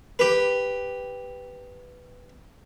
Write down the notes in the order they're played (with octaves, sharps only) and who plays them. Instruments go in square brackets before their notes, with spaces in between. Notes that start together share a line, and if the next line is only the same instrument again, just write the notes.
[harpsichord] G4 B4